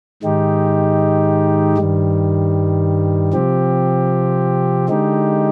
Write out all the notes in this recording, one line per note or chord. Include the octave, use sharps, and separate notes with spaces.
G#2 D#3 G#3 D#4 G4
G2 D#3 G3
C3 F3 C4 G4
D3 G#3 D#4 G4